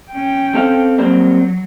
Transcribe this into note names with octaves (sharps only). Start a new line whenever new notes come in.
C#4 G5
C4 A4 F5
F#3 G3 A#3 C4